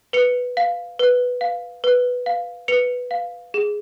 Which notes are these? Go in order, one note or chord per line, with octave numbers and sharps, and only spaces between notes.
B4 C#7 F7
F5
B4
F5
B4
F5
B4 C#7 F7
F5
G#4